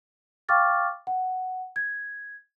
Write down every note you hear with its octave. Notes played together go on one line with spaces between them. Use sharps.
F5 G5 C#6 D6 F6 A6
F#5
G#6